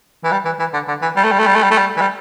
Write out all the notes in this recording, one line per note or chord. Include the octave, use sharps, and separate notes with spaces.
E3
G3
E3
E3
D3
D3
E3
G3
A3
G3
A3
G3
A3
G3
A3
G3
E3
G3